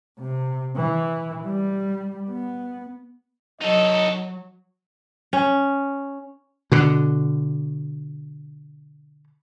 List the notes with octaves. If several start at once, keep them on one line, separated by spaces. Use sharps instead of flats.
C3
E3
G3
B3
F#3 D#4 A4 D#5
C#4
B2 D3